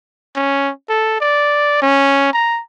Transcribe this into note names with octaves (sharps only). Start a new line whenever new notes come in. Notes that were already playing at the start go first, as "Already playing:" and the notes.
C#4
A4
D5
C#4
A#5